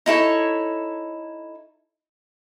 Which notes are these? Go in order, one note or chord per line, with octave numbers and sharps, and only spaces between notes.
D#4 E4 A4 C#5